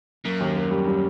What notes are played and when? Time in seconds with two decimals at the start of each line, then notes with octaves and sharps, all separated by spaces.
0.25 F#2 A#3
0.40 D#2
0.56 A#3
0.71 G3
0.88 G3